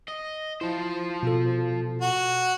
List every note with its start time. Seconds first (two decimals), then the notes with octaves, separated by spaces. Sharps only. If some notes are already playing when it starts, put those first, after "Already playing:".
0.08 D#5
0.61 F3 E4 C5
1.23 B2 F4 A4
2.02 F#4